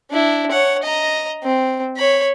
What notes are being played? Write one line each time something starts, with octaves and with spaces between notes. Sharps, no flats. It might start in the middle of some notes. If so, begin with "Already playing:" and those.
D4 E4
C#5 F#5
D#5 A#5
C4
C#5 B5